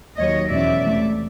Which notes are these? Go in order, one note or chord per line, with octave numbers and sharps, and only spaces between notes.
D#2 D#3 F#3 C#5 D#5
E2 B2 G#3 C#4 D5 E5
E2 C3 E3 A3